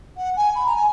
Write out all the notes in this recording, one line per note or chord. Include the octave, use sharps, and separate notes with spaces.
F#5
G#5
B5
A#5
G#5